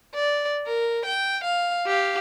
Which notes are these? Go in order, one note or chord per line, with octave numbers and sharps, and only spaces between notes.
D5
A#4
G5
F5
G4 F5